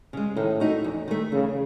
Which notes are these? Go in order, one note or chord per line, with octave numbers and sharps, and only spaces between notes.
C#3 G#3
A2 D#3
A3 D#4 F#4
E2
D#3 A3
E2 C#3